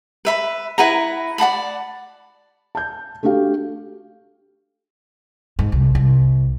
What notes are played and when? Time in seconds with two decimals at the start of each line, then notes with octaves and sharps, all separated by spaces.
0.25 B4 E5 B5
0.78 E4 B4 F#5 A#5
1.38 D5 F#5 A5 B5
2.75 A5 G6
3.23 A3 D4 F#4 G4 F5
5.59 G#2
5.72 C2
5.95 C2